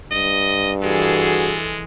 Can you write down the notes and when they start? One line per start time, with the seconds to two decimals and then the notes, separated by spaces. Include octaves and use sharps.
0.12 G2 D#5
0.83 E3 G#3 F#4 G#4 A4